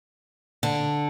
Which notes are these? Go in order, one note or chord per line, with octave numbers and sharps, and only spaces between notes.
D3